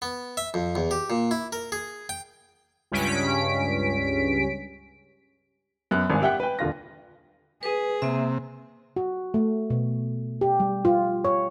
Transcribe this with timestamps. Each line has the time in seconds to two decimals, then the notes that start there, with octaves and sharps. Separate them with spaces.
0.02 B3
0.37 E5
0.54 F2
0.76 E2
0.91 G4
1.10 A#2
1.31 E4
1.53 A#4
1.72 G#4
2.09 G5
2.92 C#2 G2 C#4 B6 D7
5.91 F#2 B3 F#6
6.10 G#1 G2 G#5
6.22 G4 E5 F#5 G5 F#6
6.40 B4 G5
6.59 D#1 D3 F4 A#6
7.63 G#4 B4
8.02 C3 A#3 E5
8.96 F#4
9.34 A3
9.70 B2
10.41 G4
10.60 G3
10.85 F4
11.25 C#5